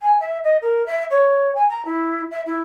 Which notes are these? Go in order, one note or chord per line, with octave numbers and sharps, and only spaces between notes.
G#5
E5
D#5
A#4
E5
C#5
G#5
A#5
E4
E5
E4